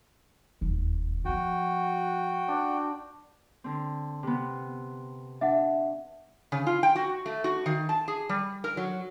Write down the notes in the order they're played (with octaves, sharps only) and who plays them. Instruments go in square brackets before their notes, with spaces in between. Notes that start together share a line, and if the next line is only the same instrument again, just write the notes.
[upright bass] E1 D#2
[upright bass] F3 B3 [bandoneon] F#4 G5
[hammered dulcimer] D4
[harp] D3 C4
C3 B3
[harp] D4 [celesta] E5 F#5
[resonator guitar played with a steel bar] C#3
F4
G5
F#4
A3
F#4
D#3
A5
G#4
G3
A#4
F#3